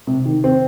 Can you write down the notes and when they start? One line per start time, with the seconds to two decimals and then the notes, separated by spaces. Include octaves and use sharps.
0.07 C3
0.26 D#3
0.44 C4